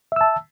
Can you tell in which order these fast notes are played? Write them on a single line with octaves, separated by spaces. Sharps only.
E5 E6 A5